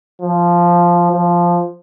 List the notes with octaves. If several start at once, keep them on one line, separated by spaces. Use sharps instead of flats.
F3
F3